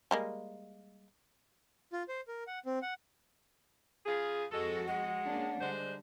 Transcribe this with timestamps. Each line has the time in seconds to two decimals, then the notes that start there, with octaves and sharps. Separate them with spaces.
0.11 G3 G#3 A#3
1.93 F4
2.09 C5
2.28 A#4
2.47 F#5
2.66 C4
2.82 F#5
4.06 C#3 F4 G#4
4.52 F2 G#3 F#4 A4
4.87 G#3 F#5
5.24 A#3 C#4 D4
5.61 D3 G3 G#3 D4 C5